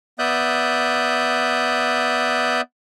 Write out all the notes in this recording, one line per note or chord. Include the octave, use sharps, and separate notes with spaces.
B3 D5 E5 D#6 F#6 G6